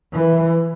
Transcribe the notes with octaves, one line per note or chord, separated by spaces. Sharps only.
E3